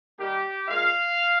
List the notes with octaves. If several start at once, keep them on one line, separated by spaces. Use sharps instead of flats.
D#3 G3 A#3 G4
A#2 G#3 F5